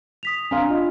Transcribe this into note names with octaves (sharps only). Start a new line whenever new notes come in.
D#6 B6 F7
D4 F5 G#5 A#5 C6
F4 D#5